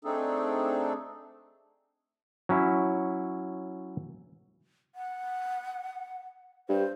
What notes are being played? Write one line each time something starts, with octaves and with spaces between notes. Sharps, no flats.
A3 C4 D4 D#4 G#4 A4
F#3 C#4 E4
F#5
G2 C5